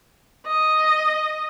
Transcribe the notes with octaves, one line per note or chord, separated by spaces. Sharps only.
D#5